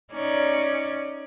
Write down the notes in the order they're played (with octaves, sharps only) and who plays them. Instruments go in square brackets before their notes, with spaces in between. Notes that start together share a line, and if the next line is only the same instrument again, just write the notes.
[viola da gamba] C#4 D#4 D5